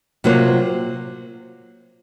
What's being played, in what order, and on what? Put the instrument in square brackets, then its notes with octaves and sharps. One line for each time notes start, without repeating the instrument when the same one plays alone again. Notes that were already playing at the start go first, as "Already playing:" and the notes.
[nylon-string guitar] C3 F#3 A#3 F4 C5